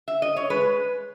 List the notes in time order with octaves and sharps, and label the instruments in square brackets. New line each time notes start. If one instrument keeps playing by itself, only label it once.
[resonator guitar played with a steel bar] E5
D#5
C#5
G#3 B4